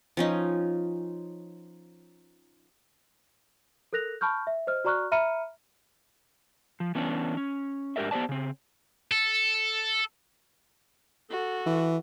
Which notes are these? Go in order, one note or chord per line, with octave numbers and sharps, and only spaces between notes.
F3 C#4 D#4
A4 A#4 F#6 A#6 F7
A5 B5 C#6 F6 G6
E5
C5 D#5 F6
F#4 D5 A#5 C#6 F6 F#6
E5 A#5 B5 F6 C#7 D#7
F3
E3 B3 C#4 D4
C#4
G#2 D4 G4 A#4 D5 E5
B3 G4 C5 D5 A5
C#3 C4
A4
F#4 A4
E3